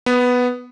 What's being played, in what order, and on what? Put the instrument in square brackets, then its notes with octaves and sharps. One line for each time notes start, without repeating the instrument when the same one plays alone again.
[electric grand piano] B3